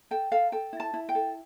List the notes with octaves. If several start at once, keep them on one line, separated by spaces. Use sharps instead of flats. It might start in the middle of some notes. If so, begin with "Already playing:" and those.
A4 G5
A4 F5
A4 G5
E4
A5
E4
G5
A4